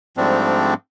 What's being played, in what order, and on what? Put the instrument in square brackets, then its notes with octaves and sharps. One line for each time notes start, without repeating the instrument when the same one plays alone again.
[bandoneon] G#2 F3 G3 A3 C4 D4